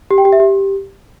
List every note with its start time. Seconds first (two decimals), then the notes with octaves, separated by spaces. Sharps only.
0.11 G4
0.18 G5
0.25 G4
0.33 E5
0.40 G4